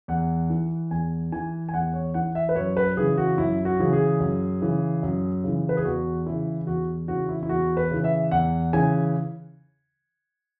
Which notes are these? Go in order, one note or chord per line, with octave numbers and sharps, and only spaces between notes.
E2 F#5
E3
E2 G#5
E3 G#5
G#5
E2 F#5
C#5
E3 F#5
E5
B4
F#2 C#5
B4
C#3 E3 G#4
F#4
F#2 E4
F#4
C#3 E3
G#4
F#2
C#3 E3
F#2
C#3 E3
B4
G#4
E2 F#4
C#3 E3 E4
E2 F#4
C#3 E3 F#4
E4
E4
E2 F#4
B4
C#3 E3
E5
E2 F#5
C#3 E3 G#5